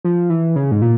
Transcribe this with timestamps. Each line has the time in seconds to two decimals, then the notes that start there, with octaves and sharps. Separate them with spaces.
0.04 F3
0.30 E3
0.56 C#3
0.71 G#2
0.82 A#2